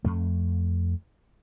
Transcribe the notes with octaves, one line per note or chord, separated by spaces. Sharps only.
F2 A3